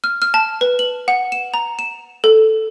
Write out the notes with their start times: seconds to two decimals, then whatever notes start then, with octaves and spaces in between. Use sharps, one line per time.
0.04 F6
0.22 F6
0.34 A5
0.61 B4
0.79 F#7
1.08 F#5
1.32 E7
1.54 A#5
1.79 E7
2.24 A4